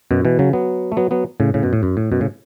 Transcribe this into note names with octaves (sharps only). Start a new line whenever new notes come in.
F#2 B2
B2 E3
C#3 F#3
F#3 B3
A3
F#3 B3
F#3 B3
A2 C#3
A2 C#3
F#2 B2
A2
F#2
A2
F#2 B2
A2 C#3